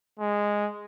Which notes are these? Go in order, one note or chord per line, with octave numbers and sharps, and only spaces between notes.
G#3